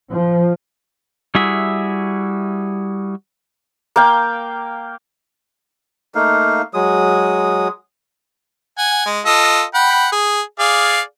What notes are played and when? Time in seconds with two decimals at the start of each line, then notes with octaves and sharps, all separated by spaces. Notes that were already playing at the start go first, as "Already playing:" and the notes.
0.12 F3
1.35 G3 E4 F#4 G#4 E5
3.96 A#3 F5 G5
6.15 A3 A#3 D#4 F5
6.74 F#3 G#3 D#6
8.78 F#5 G#5
9.06 G#3
9.26 F4 A4 D#5
9.74 F#5 G5 B5
10.12 G#4
10.59 G#4 D5 F5